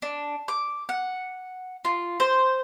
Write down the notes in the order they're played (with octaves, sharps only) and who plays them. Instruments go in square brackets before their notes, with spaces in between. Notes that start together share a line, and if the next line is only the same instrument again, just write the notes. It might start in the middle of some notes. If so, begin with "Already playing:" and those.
[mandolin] D4
D6
F#5
F4
C5